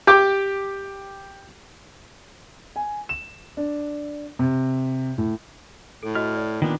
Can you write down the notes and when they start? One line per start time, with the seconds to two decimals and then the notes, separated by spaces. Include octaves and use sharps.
0.07 G4 G5 D6
2.76 G#5
3.09 E7
3.57 D4
4.39 C3
5.18 A2
6.03 A2 A4
6.15 F#4 D#5 F6
6.35 D5
6.62 A#2 D#3 B3 D4